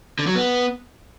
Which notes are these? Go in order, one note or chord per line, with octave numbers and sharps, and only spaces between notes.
D3
F#3
B3